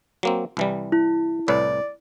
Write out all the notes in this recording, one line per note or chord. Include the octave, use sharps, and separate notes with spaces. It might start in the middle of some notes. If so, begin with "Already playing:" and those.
F#3 A#3 C4
C2 E3 G3
E4
C2 A2 B4 D5